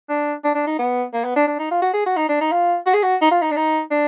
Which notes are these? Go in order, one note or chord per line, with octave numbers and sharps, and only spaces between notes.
D4
D4
D4
D#4
B3
A#3
B3
D4
D4
D#4
F4
F#4
G#4
F#4
D#4
D4
D#4
F4
F#4
G#4
F#4
D#4
F4
D#4
D4
D#4
D4